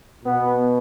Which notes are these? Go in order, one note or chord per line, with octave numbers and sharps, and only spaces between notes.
B2 B3